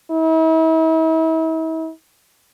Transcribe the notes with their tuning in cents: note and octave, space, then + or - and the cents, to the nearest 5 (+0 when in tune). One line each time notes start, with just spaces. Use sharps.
E4 -40